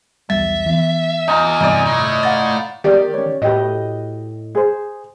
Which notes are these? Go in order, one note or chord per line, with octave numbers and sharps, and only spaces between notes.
B1 E2 G3 E5 A6
E3 B3
E2 D#4 F4
G2 C3 D#3 D#4 D5
A2
F5 F#5 A6
D#3 G4 D5
C#4 C#5
A2 F#4 G4 B4 D#5
G#4 C5